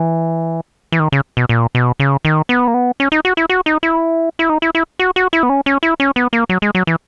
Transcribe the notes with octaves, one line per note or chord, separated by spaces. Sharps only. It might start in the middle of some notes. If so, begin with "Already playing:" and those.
Already playing: E3
E3
D#3
C#3
B2
A#2
B2
C#3
D#3
B3
A#3
B3
C#4
D#4
F#4
E4
F#4
D#4
E4
E4
D#4
E4
E4
F#4
F#4
E4
B3
C#4
C#4
E4
C#4
B3
A#3
F#3
G#3
F#3
E3